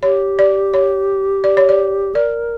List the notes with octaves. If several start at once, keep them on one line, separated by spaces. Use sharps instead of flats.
G4 C#5
D5
C#5
D5
C#5
D5
A#4 D5